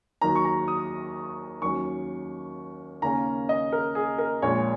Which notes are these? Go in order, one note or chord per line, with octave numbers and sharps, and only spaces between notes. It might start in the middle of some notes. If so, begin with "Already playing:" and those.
D#2 D#3 F#3 A#5
C#6
A#5
D#6
D#2 D#3 F#3 C#4 C#6
D#2 C#3 A#3 C#4 A#5
D#5
A#4
G#4
A#4
A#1 A#2 G#3 C#5